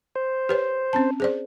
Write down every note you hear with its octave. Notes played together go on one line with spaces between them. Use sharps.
C5
G4 B4 C#5
C4 C#4 A5
G#4 C5 D5